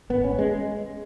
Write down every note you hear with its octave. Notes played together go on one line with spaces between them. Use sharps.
G#1 B3
C#4
G#3